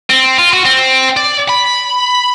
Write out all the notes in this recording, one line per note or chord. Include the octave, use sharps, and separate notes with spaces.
C4
F4
F#4
C4
D5
B5